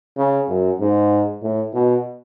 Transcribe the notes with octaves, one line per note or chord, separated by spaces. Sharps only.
C#3
F#2
G#2
A2
B2